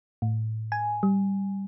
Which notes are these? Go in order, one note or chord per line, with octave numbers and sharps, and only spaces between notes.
A2
G#5
G3